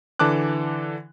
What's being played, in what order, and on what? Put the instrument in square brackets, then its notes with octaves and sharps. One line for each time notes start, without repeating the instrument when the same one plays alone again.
[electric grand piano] D3 E3 A5 D6 F#6